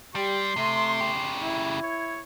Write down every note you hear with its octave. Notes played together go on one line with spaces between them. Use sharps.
G3 G4 C6
C3 A3
C#3 G4
E4
C#5